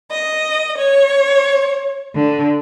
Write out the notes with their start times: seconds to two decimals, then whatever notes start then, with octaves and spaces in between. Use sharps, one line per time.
0.10 D#5
0.77 C#5
2.12 D3